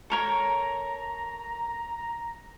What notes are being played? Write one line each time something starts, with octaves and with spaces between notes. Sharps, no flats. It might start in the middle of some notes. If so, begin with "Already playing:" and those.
A4 A#4 C#5 A#5